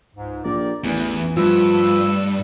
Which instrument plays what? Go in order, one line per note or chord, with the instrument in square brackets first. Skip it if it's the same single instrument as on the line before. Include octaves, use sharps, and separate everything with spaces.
[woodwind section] C#2 G#2
[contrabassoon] A#1 [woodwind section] G4 A#4 D5
[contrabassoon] A1 [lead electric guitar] E2 [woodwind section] E3
[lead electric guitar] G2 [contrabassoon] F3 [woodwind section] A3 B4 E6